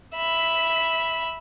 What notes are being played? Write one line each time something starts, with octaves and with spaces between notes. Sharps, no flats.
E5 B5